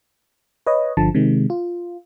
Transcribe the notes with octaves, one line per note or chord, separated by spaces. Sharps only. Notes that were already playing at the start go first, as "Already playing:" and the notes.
B4 C#5 D#5
G1 D3 F3 A5
C3 D#3 G#3
F4